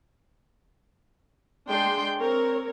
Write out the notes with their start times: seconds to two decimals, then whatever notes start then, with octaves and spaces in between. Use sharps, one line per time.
1.67 G#3 D4 G5 C6
2.20 C4 A#4 C#5